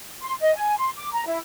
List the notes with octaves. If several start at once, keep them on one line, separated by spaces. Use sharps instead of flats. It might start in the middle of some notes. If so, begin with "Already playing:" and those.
C6
D#5
G#5
C6
D6
A#5
E4